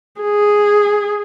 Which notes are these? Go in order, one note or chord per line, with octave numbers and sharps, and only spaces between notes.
G#4